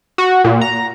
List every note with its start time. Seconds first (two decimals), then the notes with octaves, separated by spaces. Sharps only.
0.18 F#4
0.44 A#2
0.61 A#5